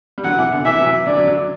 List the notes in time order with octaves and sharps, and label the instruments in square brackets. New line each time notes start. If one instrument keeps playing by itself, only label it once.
[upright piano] G3
[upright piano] D3 F#3 [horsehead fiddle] F#5
[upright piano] C3 E3
B2 D3
[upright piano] C3 E3 [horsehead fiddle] E5
[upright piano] F#3
C3 E3
[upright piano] D3 F#3 [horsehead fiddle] D5
[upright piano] D3 F#3
D3 F#3